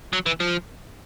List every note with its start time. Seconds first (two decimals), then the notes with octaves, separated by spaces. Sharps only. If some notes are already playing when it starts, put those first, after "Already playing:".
0.13 F#3
0.26 E3
0.40 F3